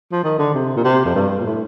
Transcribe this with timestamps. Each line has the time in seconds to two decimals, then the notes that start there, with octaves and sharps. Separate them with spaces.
0.12 F3
0.24 D#3
0.39 D3
0.54 C3
0.76 A#2
0.85 C3
1.05 F2
1.15 G2
1.40 A#2
1.46 A2